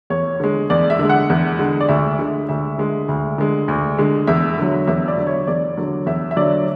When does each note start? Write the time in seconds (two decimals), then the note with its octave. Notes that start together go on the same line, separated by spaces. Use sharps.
0.10 E2 C#5
0.40 D3 G#3
0.70 E2 D5
0.90 E5
0.99 D3 G#3
1.09 F#5
1.30 E2
1.59 D3 G#3
1.81 D5
1.89 D2 E5
2.19 D3 G#3
2.49 D2 E5
2.78 D3 G#3
3.08 D2
3.38 D3 G#3
3.68 D2
3.98 D3 G#3
4.27 E2 E5
4.58 D3 F#3
4.87 E2 E5
5.08 D5
5.17 D3 F#3
5.27 C#5
5.47 E2 D5
5.77 D3 F#3
6.06 E2 E5
6.31 E5
6.36 D3 F#3 D5